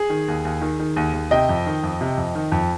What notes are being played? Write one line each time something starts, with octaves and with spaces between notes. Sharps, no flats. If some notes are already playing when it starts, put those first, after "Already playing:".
Already playing: G#4
D#3
D#2
D#2
D#3
D#3
D#2
D#2
C3 D#5 G5
F2
D#3
F2
C3
F2
D#3
F2